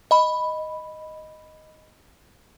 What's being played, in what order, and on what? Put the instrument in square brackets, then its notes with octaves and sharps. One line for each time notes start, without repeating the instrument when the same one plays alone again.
[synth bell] D#5 B5